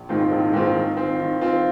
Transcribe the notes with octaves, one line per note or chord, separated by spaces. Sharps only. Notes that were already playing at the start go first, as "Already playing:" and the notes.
Already playing: A#1
G#2 D#3 C4 F4
A#1
G#2 D#3 C4 F4
D#3
C4 F4
D#3
C4 F4